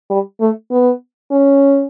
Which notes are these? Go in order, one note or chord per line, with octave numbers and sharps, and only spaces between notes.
G3
A3
B3
C#4